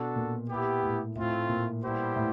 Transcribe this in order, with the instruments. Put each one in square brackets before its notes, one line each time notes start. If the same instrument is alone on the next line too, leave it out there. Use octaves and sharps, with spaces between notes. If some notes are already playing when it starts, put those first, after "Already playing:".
Already playing: [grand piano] B2 [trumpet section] D4 F#4 A4
[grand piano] A#2
[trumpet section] B3 E4 G4
[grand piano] A2
[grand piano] A2 [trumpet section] A3 C4 F4
[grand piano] A#2
[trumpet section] G3 B3 E4 G4 C5
[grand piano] A2